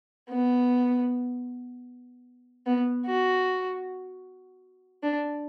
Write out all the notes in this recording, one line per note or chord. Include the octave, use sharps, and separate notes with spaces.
B3
B3
F#4
D4